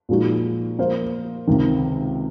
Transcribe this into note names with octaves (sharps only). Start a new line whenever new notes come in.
A#2 F3 G#3 D#4 F#4
F3 A#3 F4 C5 F5
C#2 C3 D#3